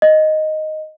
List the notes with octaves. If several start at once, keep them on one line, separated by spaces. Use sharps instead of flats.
D#5